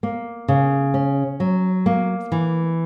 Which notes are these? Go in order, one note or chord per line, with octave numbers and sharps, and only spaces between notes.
A#3
C#3
C#4
F#3
A#3
E3